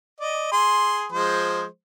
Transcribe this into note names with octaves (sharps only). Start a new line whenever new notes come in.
D5 D#5
G#4 C6
F3 G#3 C5